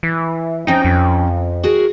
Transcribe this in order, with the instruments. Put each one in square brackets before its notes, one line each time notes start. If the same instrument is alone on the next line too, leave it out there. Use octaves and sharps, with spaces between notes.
[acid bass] E3
[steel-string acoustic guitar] F3 C#4 G5 [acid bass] D#4
[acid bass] F2
[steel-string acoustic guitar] F#4 G#4 A#4